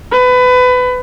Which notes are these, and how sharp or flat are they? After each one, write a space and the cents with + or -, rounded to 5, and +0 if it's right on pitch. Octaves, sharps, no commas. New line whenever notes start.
B4 +25